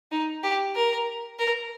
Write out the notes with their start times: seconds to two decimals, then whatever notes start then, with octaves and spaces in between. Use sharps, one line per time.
0.12 D#4
0.43 G4
0.75 A#4
1.39 A#4